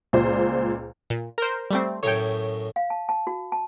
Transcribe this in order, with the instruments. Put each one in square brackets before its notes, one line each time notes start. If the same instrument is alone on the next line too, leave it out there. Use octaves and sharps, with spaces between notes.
[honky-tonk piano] C#2 A#2 C5 D5
[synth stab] A#2
A#4 C5
G3 A3 C4
[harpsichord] F#2 A2 [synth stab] C#5 G5
[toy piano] F5
A5
A5
F#4
A5